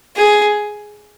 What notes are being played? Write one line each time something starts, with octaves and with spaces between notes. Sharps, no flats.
G#4